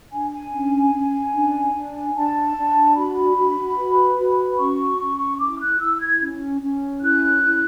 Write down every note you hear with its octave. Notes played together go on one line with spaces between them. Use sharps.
D4 G#5
G#5
C#4
C#4
D4
D4
D4 A5
D4
F#4 B5
F#4
B4
F#4
C#4 C#6
C#4
E4 D6
F#6
E4 E6
G#6
C#4
C#4
E4 F#6
E4